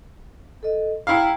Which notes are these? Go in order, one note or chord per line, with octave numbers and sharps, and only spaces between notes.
A4 D#5
E4 F5 G5 A#5